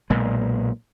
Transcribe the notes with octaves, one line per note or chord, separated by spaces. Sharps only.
B1 A#2 G#3